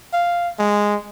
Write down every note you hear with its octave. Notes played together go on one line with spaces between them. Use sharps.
F5
G#3